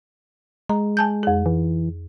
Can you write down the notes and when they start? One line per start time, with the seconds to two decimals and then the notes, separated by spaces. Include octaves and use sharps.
0.69 G#3 A#5
0.97 G#5 A5 G6
1.23 F2 G#4
1.46 E3